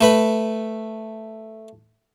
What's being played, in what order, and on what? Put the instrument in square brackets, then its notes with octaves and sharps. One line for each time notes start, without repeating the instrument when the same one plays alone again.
[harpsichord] A3 B4 B5